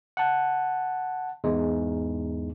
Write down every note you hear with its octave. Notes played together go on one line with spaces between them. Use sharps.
F#5 A5
E2 G#2 G#3